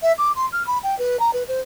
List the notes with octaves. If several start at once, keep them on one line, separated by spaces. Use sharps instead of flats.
E5
D6
C6
F6
B5
G5
B4
A#5
B4
C5